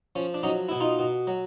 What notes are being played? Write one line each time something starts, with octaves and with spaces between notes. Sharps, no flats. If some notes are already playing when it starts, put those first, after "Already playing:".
F3 C#4
D4
F#3 C#4 D#4
B2 E4
D#4 F4
B2
F#3